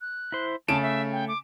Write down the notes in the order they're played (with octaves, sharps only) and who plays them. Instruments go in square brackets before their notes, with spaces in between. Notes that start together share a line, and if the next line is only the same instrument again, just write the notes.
[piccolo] F#6
[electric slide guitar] E4 C5
[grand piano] C#3 D7 E7 [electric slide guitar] A3 [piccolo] A5
[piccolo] E5
G5
D6